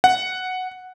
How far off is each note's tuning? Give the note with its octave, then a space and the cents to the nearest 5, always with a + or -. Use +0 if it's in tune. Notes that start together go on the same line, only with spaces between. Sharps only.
F#5 +0